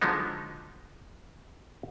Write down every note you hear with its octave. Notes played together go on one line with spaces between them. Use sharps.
D3 F3 F#3 G#3 B3 D#4